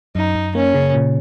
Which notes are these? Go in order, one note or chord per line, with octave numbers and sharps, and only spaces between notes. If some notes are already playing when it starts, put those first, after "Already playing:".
F#2 D#4
F#2
A#3 C#4
C#3
A#2